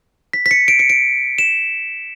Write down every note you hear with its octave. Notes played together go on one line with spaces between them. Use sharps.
B6
B6
C#7
D7
C#7
D7
E7